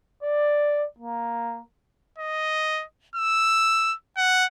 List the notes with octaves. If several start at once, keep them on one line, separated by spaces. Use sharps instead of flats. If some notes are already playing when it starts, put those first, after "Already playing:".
D5
A#3
D#5
E6
F#5